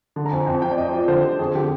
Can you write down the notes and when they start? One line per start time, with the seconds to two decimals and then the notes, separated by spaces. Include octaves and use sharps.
0.16 D3
0.26 A#5
0.31 F2 G#5
0.46 F2 G5
0.62 F2 G5
0.71 D5
0.78 F2 D#5
0.89 C5
0.93 F3 D5
1.08 D3 C5
1.23 D3 G4
1.39 F2 G#4
1.55 D3 G4